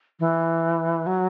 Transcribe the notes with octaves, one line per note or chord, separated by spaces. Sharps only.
E3
F#3